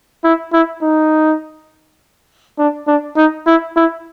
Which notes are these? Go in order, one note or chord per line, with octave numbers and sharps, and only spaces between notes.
E4
E4
D#4
D4
D4
D#4
E4
E4